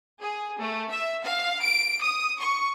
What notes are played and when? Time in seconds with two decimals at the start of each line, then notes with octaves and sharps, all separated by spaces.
0.21 G#4
0.61 A3
0.91 E5
1.24 F5
1.62 D7
2.04 D#6
2.40 C#6